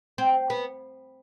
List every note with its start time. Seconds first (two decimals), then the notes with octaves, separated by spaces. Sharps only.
0.18 C4
0.50 B3